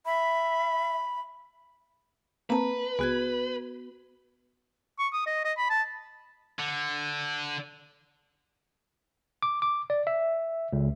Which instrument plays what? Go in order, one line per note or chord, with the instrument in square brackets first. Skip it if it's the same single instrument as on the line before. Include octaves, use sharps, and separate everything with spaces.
[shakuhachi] E5 [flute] B5
[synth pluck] A#3 C4 [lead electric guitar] B4 [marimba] A5 A#5
[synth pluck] C#2 G#4 [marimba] B3 F#4 G#6
[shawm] C#6
D#6
D#5
D#5
B5
A5
[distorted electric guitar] D3
[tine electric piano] D6
D6
D5
E5
C#2